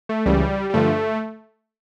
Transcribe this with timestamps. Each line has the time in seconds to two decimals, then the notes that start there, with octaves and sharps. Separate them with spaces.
0.09 A3
0.26 C#2 C#3 E3 G3
0.70 G3
0.74 G2 D3 F3 A3